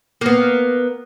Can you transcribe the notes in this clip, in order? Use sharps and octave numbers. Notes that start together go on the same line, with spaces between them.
A#3 B3